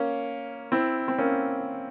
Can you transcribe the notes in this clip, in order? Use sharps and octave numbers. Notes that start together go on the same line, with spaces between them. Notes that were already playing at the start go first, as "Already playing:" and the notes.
Already playing: A#3 C#4
C4 E4
C4
A#3 C#4